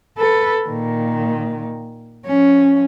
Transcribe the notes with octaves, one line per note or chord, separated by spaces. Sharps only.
A4 B4
A#2 D#3
F3 C#4